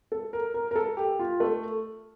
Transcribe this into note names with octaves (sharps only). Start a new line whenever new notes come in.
A4
A#4
A#4
A#4
A4
G4
F4
A3